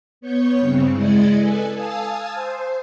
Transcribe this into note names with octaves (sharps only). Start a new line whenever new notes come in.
B3 C#5 C#6 G6
G2 C#3 C4
G#3 E4 D5 D#5 G#6 C#7
A4 B4 G#5
F5 G#5 A5 D#6 E6
C5